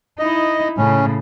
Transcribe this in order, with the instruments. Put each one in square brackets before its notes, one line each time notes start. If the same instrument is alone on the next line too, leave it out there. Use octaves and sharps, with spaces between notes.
[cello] D#4 E4 [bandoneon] D#5
[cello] A2 C#3 [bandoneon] C#4